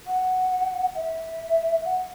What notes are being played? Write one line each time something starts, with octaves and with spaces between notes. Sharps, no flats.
F#5
E5
F#5